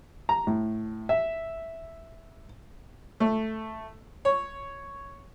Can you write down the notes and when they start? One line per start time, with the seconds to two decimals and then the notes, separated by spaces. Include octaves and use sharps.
0.29 A#5
0.47 A2
1.09 E5
3.20 A3
4.25 C#5